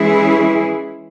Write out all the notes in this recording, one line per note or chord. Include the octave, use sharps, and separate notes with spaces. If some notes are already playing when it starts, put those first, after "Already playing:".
Already playing: E3 G#3 C#4 E4 G#4